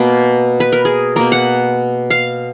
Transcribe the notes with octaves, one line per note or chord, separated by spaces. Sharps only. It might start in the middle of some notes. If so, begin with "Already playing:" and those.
Already playing: B2 A#3
B4
A#4
G#4
B2 A#3 A#4
F#5
F5